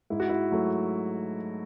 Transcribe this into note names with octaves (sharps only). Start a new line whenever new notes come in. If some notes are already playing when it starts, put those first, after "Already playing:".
G#2 E4
F#4
E4
F#3 A3